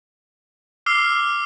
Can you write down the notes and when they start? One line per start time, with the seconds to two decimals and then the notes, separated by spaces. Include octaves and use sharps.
0.86 D6 E6 F6 C7 G7